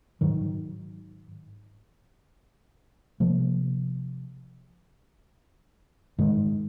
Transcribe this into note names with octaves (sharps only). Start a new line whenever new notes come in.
G#2 D#3 F#3
C3 F3 A#3
G#2 D#3 G#3